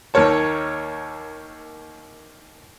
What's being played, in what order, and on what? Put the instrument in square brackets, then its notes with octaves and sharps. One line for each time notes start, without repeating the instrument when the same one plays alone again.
[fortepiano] D#2 A#3 A#4 C#5 A5